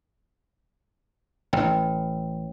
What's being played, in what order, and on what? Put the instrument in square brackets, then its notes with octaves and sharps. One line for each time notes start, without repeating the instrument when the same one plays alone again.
[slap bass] A1 [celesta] G5